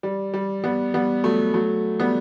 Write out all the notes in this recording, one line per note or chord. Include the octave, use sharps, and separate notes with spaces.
G3
G3
G3 B3
G3 B3
F#3 A3
F#3 A3
G3 B3